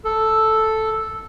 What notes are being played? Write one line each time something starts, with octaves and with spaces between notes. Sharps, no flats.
A4